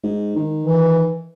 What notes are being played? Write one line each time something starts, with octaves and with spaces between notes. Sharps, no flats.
G#2
D#3
E3